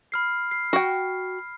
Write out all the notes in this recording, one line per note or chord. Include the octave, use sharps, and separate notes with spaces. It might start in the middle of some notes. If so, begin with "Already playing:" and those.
B5 F6 C7
C7
F#4 G5